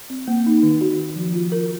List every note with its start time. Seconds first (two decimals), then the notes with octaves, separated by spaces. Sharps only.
0.10 C4
0.28 A#3
0.46 D#4
0.63 D#3
0.81 F#4
0.98 F#4
1.16 F3
1.34 F4
1.52 A#4